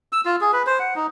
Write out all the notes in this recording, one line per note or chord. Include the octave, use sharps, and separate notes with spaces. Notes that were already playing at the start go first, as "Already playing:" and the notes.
E6
F4
G#4
B4
C5
F#5
D#4